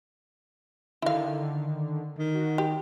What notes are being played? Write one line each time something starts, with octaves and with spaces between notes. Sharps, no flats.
D3 D#3 E4 F5
D#3
F#4
G4